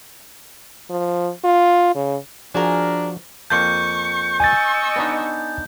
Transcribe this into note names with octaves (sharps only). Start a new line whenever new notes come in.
F3
F4
C#3
F3 D4 F#4 G#4 A#4
F2 A#3 A5 C#6 G6
D#5 G#5 C#6 E6 A6
B3 D4 D#4